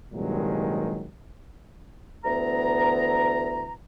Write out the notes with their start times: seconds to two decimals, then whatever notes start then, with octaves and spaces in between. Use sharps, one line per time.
0.14 C2 G2 A#2 D#3 F#3 G#3
2.24 D2 E3 B3 A#5